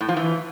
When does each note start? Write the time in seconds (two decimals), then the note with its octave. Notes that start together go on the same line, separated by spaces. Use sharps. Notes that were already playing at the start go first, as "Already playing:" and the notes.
0.01 A2
0.09 F3
0.17 E3